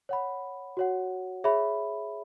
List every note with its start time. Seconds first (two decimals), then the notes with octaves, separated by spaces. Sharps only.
0.09 C#5 F#5 B5
0.77 F#4 C#5 F#5
1.44 G#4 C#5 E5 B5